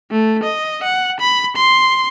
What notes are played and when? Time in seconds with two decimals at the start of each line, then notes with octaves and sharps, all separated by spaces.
0.11 A3
0.43 D#5
0.83 F#5
1.20 B5
1.56 C6